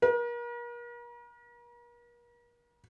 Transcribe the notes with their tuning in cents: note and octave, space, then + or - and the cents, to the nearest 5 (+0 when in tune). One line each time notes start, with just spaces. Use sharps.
A#4 +40